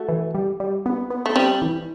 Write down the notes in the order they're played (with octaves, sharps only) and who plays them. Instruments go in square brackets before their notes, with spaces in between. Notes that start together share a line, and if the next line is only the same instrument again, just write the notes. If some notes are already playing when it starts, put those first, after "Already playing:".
Already playing: [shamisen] A3 [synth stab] F#4
[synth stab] E3
G3
G3
B3
B3
[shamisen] A3
[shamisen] G3 [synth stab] C4
[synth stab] E3